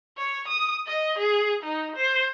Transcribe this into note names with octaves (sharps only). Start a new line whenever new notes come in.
C#5
D#6
D#5
G#4
D#4
C5